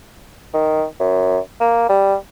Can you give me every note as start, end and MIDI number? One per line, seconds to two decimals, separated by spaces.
0.54 0.84 51
1.00 1.39 42
1.61 1.88 58
1.89 2.15 55